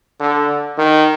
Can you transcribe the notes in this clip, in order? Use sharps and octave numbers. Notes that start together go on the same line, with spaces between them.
D3
D#3